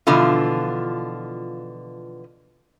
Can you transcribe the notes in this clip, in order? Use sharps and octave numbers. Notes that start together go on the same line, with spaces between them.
B2 D3 E3 F3 F4